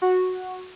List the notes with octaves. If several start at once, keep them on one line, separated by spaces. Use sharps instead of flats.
F#4